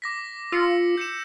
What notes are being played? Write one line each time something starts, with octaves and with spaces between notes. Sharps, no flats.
D6 A#6 B6
F4 E6 C#7
G6 C#7 E7